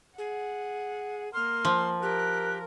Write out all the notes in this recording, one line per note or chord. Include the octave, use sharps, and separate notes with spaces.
G#4 F#5
A#3 C6 F6
F3
G4 A#4 F#6